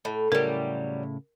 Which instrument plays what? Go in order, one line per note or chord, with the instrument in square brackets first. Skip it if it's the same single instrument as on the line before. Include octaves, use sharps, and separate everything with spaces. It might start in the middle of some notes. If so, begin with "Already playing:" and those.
[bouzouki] A2
[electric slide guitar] A2 C#3 E4 [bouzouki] F#3 G3 [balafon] A#4